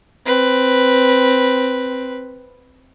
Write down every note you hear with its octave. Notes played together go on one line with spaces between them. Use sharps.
C4 B4